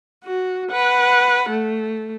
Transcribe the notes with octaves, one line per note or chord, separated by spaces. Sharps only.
F#4
B4 F#5
A3